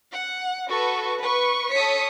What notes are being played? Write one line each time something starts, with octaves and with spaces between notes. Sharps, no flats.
F#5
F#4 A4 B4 C#6
B4 C#6
A4 C#5 D#6 B6 C#7